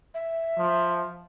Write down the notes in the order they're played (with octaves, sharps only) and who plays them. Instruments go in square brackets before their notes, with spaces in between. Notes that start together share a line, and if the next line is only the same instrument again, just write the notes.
[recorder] E5
[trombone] F3